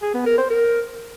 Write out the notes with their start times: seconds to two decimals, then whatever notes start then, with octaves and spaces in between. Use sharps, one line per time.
0.02 G#4
0.14 B3
0.26 A#4
0.38 C5
0.50 A#4